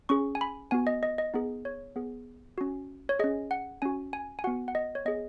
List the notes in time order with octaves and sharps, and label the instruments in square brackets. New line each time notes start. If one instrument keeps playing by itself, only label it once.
[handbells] C#4 G#4 C#6
G#5
B5
B3 F#4 G#5
D#5
D#5
D#5
B3 D#4 G#4
C#5
B3 G#4
C#4 F#4
C#5
C#4 G#4 D#5
F#5
C#4 F#4 G#5
G#5
G#5
B3 F#4 F#5
F#5
D#5
C#5
B3 G#4 D#5